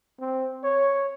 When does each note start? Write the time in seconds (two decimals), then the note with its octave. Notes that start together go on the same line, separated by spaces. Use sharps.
0.20 C4
0.64 C#5